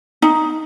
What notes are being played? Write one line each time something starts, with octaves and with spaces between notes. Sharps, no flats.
D#4